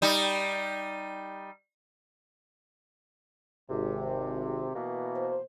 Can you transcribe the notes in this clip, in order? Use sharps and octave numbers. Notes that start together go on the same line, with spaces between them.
G3 D#4
G#1 C3
B2 E3 A#3
C5